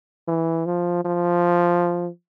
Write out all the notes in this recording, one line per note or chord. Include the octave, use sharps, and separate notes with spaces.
E3
F3
F3